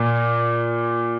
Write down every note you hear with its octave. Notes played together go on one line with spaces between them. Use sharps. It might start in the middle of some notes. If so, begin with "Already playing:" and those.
Already playing: A#2